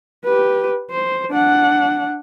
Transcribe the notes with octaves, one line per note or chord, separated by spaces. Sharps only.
G4 B4
C5
D4 F#5